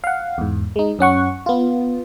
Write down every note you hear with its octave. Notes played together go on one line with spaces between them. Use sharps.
F5 F#5
E2 G#2
G#3 D#4
F#2 C#4 F#5 C#6
B3 F4